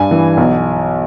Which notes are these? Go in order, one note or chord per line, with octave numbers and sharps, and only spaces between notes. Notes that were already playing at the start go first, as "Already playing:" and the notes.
Already playing: G2 G#5
E3
B1